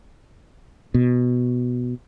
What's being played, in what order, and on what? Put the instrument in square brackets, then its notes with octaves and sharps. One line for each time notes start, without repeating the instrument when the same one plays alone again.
[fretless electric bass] B2